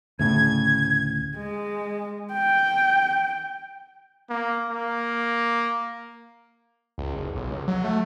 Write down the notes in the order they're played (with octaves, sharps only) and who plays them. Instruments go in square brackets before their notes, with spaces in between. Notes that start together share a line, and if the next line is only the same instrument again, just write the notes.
[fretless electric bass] D2 A2 C#3 [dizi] G#6
[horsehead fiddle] G#3
G5
[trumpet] A#3
A#3
[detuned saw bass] C#2
F#1
B1
C#2
F#3
A3